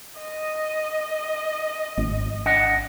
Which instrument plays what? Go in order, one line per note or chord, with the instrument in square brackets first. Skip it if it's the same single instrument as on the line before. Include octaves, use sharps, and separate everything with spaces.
[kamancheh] D#5
[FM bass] G#1
[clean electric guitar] D4 D#5 F#5